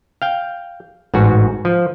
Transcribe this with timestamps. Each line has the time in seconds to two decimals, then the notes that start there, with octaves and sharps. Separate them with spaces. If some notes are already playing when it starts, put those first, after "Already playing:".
0.22 F5 G5
1.14 A1 G#2 F#4
1.65 F3